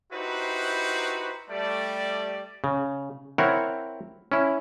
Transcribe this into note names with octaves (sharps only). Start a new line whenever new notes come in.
D#4 E4 F#4 G4 B4 C5
G3 A3 D5
C#3
C4 E4 A#4 C#5 E5 F#5
C#4 E4